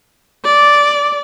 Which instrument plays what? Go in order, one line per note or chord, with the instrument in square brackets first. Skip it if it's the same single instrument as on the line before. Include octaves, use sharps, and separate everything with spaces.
[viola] D5